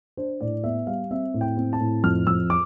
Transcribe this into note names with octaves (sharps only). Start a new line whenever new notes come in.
D4 C5
A2 D5
B3 E5
G3 F5
C4 E5
A2
G5
C4
A5
A2
F2 F6
F2 E6
D6